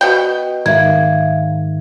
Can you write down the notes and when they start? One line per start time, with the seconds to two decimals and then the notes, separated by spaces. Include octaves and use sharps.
0.01 B2 G5
0.66 G#2 D#3 A#3 E5 G#6